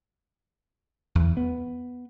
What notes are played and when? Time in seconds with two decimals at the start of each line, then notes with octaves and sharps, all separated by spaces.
1.15 E2
1.37 B3